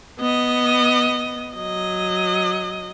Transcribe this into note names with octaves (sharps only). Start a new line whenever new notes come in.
B3 D#5
F#3 D#5